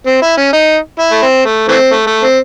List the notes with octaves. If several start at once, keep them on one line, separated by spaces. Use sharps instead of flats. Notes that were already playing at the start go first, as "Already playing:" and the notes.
C4
E4
C#4
D#4
E4
A3
C4
A3
E3 A3 C4
A3
A3
C4